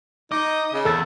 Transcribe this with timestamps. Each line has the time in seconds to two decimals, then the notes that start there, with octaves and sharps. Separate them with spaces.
0.32 D#4 D#5 D6
0.74 C#3
0.85 E2 A4 E6 A6